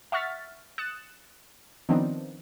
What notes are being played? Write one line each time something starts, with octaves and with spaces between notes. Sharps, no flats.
E5 F#5 C#6 F6 A6 B6
D#6 F#6 A6 C#7 E7
D#3 F3 B3 C4 D4 D#4